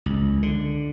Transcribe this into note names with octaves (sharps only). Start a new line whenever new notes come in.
C#2
D3